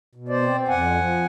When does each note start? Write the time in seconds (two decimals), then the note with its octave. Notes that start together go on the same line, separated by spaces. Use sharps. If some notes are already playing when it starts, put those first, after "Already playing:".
0.15 B2
0.28 C5 D5
0.42 C4
0.68 F2 F#5 G#5
0.94 F3